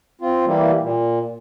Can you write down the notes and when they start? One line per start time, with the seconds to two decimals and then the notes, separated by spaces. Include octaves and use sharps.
0.21 C4 F4
0.46 E3 G3 A#3
0.81 A#2